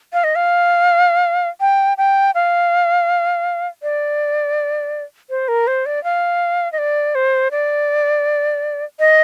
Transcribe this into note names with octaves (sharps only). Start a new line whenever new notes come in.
F5
D#5
F5
G5
G5
F5
D5
C5
A#4
C5
D5
F5
D#5
D5
C5
D5
D#5